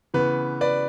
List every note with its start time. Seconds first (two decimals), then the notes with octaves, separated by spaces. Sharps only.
0.14 C#3 E3 B3 B4
0.61 B4 D5